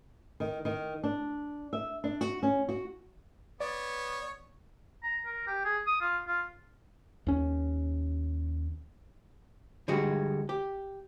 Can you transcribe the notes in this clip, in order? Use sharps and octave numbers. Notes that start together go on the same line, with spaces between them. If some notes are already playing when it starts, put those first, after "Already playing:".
D#3
D#3
D4
E5
D4
F#4
C#4
F#4
B3 C#5 D5
A#5
A#4
G4
G#4
D#6
F4
F4
D#2 C#4
D3 G3 G#3 F#4
G4